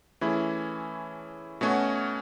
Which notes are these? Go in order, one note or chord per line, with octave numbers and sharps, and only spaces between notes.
E3 A3 C#4 E4 G#4
B2 A3 C#4 F#4